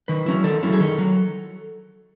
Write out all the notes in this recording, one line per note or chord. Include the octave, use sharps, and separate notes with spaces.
D#3 B4
F#3 C#4 E4
D#3 A4
F#3 C#4 E4
G#4
D#3 A4
F#3